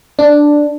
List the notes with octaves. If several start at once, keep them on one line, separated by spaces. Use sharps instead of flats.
D4